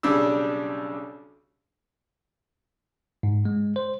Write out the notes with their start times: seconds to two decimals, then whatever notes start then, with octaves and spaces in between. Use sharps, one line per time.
0.03 B1 C#3 G3 D4 E6
3.23 G#2
3.45 G#3
3.76 C5